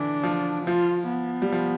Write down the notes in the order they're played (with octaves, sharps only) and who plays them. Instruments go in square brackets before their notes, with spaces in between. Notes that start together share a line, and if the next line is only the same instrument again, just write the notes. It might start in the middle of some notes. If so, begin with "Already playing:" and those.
Already playing: [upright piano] D3 E3 [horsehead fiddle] D4
[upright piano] F3
[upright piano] F3 [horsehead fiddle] F4
[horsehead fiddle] B3
[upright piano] G3
F3